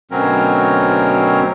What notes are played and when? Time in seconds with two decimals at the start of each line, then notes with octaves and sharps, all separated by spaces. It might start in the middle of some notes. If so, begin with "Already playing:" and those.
0.11 D2 B2 F#3 C4 C#4 A#4